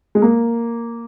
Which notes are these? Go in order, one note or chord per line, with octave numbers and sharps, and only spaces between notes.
G#3
A#3